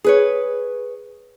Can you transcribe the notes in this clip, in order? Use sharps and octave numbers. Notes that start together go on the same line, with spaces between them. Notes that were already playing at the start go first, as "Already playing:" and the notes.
G#4 B4 C#5